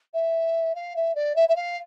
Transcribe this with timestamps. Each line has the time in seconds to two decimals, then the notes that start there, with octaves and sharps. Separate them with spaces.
0.13 E5
0.75 F5
0.96 E5
1.15 D5
1.35 E5
1.48 E5
1.56 F5